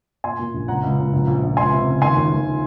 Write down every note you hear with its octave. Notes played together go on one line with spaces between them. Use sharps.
A#2 G#5 C6
A#2
A#1
C#2 F#5 A#5
C#2
C#2
A#1
A#1
A#1
C#2 G#5 C6
C3
C#2
D#2 G#5 C6
D#2
D#2